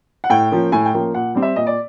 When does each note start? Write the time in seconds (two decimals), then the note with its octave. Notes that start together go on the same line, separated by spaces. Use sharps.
0.24 F#5
0.30 A2 G5
0.51 F3 A#3 C#4
0.72 A2 G#5
0.86 G5
0.93 F3 A#3 C#4
1.15 A#2 F#5
1.35 G3 C4
1.42 E5
1.56 A#2 D#5
1.67 D5